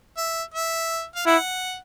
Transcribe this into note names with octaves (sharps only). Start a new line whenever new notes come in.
E5
E5
F5
E4 F#5